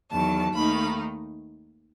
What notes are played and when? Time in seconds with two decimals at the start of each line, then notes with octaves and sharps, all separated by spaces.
0.11 E2 D#3 F#3 A5
0.54 D#2 D#3 A3 D#4 B5